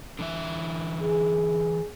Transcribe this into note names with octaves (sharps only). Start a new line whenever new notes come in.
D3 E3 E5
G#4